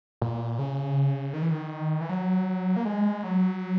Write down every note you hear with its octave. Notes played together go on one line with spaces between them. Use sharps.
A#2
C#3
D#3
E3
D#3
E3
F#3
A#3
G#3
F#3